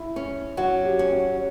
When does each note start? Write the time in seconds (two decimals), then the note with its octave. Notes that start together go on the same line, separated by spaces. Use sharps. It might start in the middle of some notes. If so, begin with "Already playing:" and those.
Already playing: E4
0.16 C#4
0.57 F#3 F#4
0.85 G4
0.99 C#4
1.13 F#4